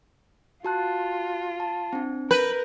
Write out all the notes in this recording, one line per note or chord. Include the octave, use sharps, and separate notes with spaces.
F4 F#4 A5 F#6
A5
C4 D4
A#4 B4 G6